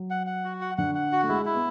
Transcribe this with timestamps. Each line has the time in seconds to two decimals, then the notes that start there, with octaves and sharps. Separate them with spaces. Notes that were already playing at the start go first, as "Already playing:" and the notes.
Already playing: F#3
0.10 F#5
0.27 F#5
0.44 F#4
0.61 F#5
0.78 D3 F#5
0.95 F#5
1.12 F#4
1.23 A3
1.29 G#3 E4
1.45 E4
1.55 B3